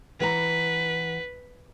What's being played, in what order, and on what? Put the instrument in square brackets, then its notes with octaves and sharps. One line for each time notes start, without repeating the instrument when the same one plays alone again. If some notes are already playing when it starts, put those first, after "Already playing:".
[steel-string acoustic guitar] E3 F#5 A#5 [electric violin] B4